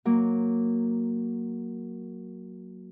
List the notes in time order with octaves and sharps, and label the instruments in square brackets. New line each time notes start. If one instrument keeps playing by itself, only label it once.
[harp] F#3 A#3